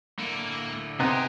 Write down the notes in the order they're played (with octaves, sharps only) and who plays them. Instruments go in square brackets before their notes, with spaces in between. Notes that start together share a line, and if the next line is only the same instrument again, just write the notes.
[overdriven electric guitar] D3 E4 [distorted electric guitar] A#3
[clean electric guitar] C3 B3 D#4 [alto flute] C4 [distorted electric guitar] G4 G#4